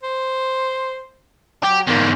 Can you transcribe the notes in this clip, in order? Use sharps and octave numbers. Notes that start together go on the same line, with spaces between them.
C5
F#3 G4
E2 G#2 A#3